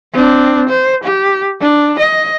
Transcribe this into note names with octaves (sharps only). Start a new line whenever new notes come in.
C4 D4
C5
G4
D4
D#5